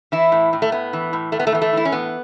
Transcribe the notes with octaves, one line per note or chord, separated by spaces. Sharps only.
E3 E4
A2
A2
A3
A2 B3
E3
A2
A2 A3
B3
A3
E3 B3
A3
E3 E4
C#4
A2 B3